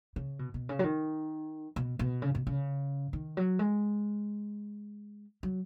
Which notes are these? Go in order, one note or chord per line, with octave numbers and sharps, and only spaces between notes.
C#3
B2
B2
C#3
F#3
D#3
B2
B2
C#3
B2
C#3
D#3
F#3
G#3
F#3